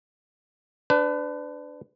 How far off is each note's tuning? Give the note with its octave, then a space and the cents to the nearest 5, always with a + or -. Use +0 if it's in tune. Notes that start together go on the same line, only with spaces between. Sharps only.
D4 +0 B4 +35